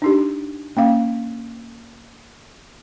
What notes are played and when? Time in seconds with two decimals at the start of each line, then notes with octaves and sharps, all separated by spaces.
0.02 D4 D#4 G4
0.77 A#3 C#4 F5